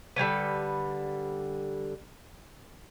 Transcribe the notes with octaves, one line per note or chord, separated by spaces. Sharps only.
D3 G3 C#4 B4